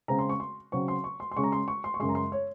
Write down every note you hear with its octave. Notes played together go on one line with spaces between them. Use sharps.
C#3 G#3 C4 A#5
C6
C#6
C6
C#3 F#3 C4 C#6
C6
C#6
C6
C6
C#3 G#3 C#4 C#6
A#5
C6
C#6
C6
C#6
F#2 C#3 G#3 C6
A#5
C6
C#5